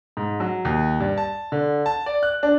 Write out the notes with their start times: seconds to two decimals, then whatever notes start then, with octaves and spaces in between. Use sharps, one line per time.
0.17 G#2
0.40 F#3
0.65 D#2
1.00 G2
1.17 A5
1.52 D3
1.86 A5
2.06 D5
2.23 F#6
2.43 D4